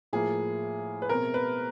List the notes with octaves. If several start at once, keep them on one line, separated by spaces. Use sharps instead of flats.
A2 F3 A#3 G#4
B4
B2 G#3 C4 A#4
B4